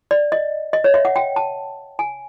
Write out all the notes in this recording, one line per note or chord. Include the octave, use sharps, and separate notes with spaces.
D5
D#5
D#5
C#5
E5
F#5
G5
A5
G#5